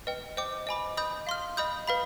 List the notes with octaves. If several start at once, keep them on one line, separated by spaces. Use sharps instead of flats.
B4 D#5 G5
C5 D#5 G5 D6
D#5 G#5 B5 D6
D#5 B5 D#6 G6
F5 C6 F6
D#5 B5 D#6 G6
B4 F5 B5